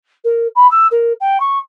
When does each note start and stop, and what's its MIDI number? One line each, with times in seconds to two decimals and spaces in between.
0.24 0.47 70
0.55 0.69 83
0.71 0.87 88
0.91 1.13 70
1.20 1.40 79
1.40 1.59 85